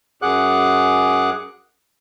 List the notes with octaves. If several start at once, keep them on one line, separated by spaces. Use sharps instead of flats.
F#2 G#4 F#5 D6 F#6